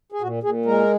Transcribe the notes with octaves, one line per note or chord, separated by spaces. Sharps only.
G#4
A#2 F#4
A#2 G#4
G#3 A#4